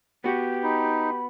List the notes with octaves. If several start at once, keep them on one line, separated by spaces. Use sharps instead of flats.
B3 F#4 G4
D#4 B5